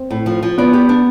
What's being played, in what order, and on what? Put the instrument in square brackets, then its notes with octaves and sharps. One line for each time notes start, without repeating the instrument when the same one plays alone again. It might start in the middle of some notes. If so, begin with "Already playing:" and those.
Already playing: [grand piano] C4
[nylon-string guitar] A2
F3
F3
[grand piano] B3 [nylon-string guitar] D5
[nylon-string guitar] G4
D4